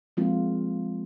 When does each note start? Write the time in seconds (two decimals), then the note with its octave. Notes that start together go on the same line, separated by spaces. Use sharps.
0.17 F3 G#3 A#3 C4 F4